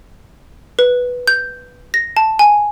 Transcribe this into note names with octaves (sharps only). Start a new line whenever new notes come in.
B4
G6
A#6
A5
G#5